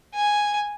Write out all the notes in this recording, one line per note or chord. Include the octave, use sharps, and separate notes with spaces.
G#5